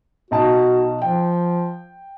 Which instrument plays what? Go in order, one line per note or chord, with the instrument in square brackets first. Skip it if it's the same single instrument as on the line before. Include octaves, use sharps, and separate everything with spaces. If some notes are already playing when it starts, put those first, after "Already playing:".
[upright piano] B1 D#4 A5 [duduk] F#4
[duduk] F3 [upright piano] G5